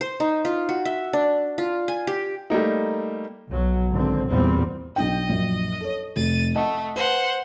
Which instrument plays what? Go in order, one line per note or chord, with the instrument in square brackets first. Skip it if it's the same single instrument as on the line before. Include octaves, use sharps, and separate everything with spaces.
[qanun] C5
D#4
F4
F#4
E5
D4
F4
G#5
G4
[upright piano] G3 A3 A#3 D#4
[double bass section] B1 F#3
G#1 D3 C4
E2 A#2 G3 C4
[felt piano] B1 D4 G5 [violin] D#5
[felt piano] A#1 F#2
A4 C#5
[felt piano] F1 [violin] A6 D#7
[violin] A3 [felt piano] D#5 F#5 A5
[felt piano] B4 [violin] C5 F#5